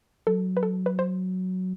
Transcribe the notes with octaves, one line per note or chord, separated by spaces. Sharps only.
F#3 A4
B4
A4
B4
C5